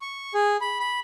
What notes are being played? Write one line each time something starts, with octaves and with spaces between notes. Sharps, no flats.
C#6
G#4
B5
B5